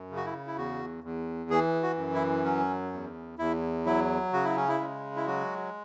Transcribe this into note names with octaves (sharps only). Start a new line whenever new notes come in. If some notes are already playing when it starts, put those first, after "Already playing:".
Already playing: F#2
C#3
F#4
E4
E4
E2 F#4
E2
E3 G#4
F#4
F#2
E4
F#3 C#4
E2
E2 E4
F#3 E4
C#3 F#4
E4
C#4
E4
G#3
E4
F#3 F#4